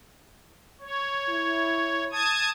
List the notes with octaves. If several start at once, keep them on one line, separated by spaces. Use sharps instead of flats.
C#5
E4
A5 D#6 G#6